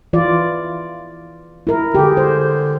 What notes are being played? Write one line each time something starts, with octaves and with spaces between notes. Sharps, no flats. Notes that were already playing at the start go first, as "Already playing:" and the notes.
E3 F4 D5
E4 A#4
D3 G4 G#4
C5